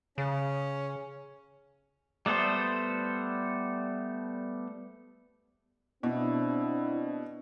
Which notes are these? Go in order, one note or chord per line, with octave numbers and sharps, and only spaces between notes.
C#3 C#4
G3 A3 B3 A4 C5
B2 C4 D4 E4